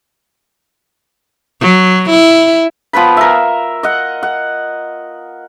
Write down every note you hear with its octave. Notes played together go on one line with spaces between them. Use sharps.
F#3
E4
F3 B3 B4 B5
A#4 E5
D#5 F#5
F#5